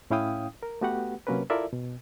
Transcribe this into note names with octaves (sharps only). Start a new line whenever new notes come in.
A2 C#4 E4 F5 G5 D#6
A#4
A3 B3 F#4 G4 B4 F#5
C3 F#3 A#3 C#4 A#4 B4
E4 F4 A4 A#4 D5 E5
B2